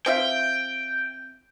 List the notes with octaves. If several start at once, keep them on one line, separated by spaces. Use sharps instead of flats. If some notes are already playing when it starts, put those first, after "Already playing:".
C4 F4 E5 G5